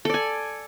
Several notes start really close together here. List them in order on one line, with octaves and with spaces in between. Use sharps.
A4 D5 G#5